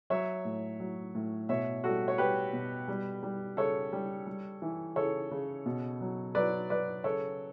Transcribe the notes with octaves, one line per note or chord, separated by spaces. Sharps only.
F#3 C#5 E5
A2
F#3
A2
B2 C#5 E5
G3 F#4 A4
C#5
G3 G4 B4
B2
G3
G3
C#3 A4 C#5
G3
G3
E3
C#3 A4 C#5
C#3
B2
F#3
F#3 B4 D5
F#3 B4 D5
C#3 A4 C#5